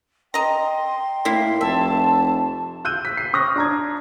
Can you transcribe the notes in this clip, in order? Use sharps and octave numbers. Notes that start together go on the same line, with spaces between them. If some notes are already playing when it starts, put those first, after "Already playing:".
D#5 G5 A#5 C6
A2 A#3 E4 C7
F1 E5 A5
E6 F#6 G6 D#7
B6
C7
C#6 D#6 F6 F#6 A#6
D4 A#5 G#6